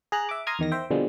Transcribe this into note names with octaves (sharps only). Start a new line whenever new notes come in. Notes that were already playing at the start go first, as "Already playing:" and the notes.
G#4 A#5 F#6
E5 D6
A#5 C6 D#6 F6 G#6
E2 D#3 A#6
C5 E5 G5
B2 D3 F3 G3 G#3 C4